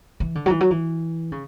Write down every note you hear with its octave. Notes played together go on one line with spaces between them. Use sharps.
E3
D3
F#3
E3
F#3
E3
C#3